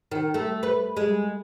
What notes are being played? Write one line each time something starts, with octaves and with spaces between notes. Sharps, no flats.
D#3
A3
B4
G#3